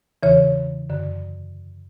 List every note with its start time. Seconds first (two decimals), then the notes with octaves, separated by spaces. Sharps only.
0.23 E2 C#3 E3 C#5
0.90 F#2 D3